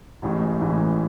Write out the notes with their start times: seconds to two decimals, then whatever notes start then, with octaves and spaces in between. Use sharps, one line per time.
0.22 A1 A2 E3 G#3
0.61 A1 A2 E3 G#3